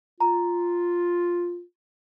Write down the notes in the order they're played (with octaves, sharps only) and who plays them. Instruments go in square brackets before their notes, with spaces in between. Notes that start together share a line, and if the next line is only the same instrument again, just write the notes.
[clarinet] F4 [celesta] A#5